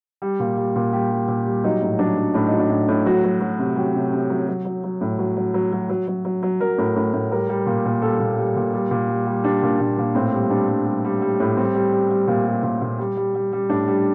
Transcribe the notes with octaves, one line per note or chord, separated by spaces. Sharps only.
G3
A#2
G3
A#2
G3 G4
G3
A#2
G3
F#3 D#4
A2
F#3 D4
F#3
A2 D4
F#3 D#4
D4
A2
A2
F#3 F#4
F#3
F#3
C3
F#3 G4
C3
C3
F#3
F#3
F#3
F#3
A2
F#3
F#3
F#3
F#3
F#3
F#3
F#3
F#3
F#3 A#4
A2
A2
A2
G3 A#4
G3
A#2
A#2
G3 A4
A#2
G3
A#2
G3
A#2
G3
G3
G3 D4
A#2
A#2
A#2
A2 C4
G3
G3 D4
G3
G3
G3
G3
A2
G3 C4
G3
G3
G3
A#2
G3
A#2
A#2
G3
G3
G3
G3
A2 D4
G3